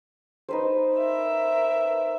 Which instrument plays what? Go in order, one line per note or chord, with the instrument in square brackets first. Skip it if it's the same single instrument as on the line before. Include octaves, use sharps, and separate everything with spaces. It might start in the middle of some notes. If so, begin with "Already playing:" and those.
[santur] D#4 B4 C5
[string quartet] A#4 E5